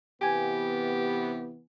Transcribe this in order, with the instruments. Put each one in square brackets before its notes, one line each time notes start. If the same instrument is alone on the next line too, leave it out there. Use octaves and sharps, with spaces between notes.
[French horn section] C3 E3 B3 [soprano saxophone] G4 [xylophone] G5 G#5 G#6